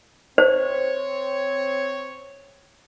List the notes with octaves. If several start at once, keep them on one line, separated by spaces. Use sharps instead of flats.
C4 C5 C#5